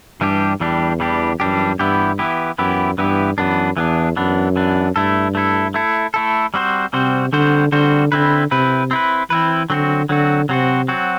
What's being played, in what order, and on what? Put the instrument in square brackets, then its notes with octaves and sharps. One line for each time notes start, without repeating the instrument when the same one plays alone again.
[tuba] G2 [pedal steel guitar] E3 G3 D4 G4
[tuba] E2 [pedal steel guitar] E3 G3 D4 G4
[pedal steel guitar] E3 G3 D4 G4
[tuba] F#2 [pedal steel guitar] E3 G3 D4 G4
[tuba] G2 [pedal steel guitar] E3 B3 E4 G4
[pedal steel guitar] E3 B3 E4 G4
[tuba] F#2 [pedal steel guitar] E3 B3 E4 G4
[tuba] G2 [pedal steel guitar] E3 B3 E4 G4
[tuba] F#2 [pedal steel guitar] E3 B3 D4
[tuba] E2 [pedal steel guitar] E3 B3 D4
[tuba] F#2 [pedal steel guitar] E3 B3 D4
[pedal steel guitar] E3 B3 D4
[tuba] G2 [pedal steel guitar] A3 E4 A4
[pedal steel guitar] A3 E4 A4
A3 E4 A4
A3 E4 A4
G3 C4 F#4 C5
[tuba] C3 [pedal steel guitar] G3 C4 F#4 C5
[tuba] D3 [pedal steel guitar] G3 C4 F#4 C5
[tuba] D3 [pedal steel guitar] G3 C4 F#4 C5
[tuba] D3 [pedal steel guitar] C4 E4 B4
[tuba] C3 [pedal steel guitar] C4 E4 B4
[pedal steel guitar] C4 E4 B4
[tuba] E3 [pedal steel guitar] C4 E4 B4
[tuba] D3 [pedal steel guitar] F#3 C4 F#4
[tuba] D3 [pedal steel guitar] F#3 C4 F#4
[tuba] C3 [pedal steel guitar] F#3 C4 F#4
[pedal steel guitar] F#3 C4 F#4